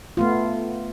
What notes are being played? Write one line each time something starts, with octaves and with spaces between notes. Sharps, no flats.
A3 B3 F4